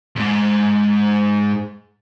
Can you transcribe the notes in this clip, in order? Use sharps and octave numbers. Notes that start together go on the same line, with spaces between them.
E2 G#2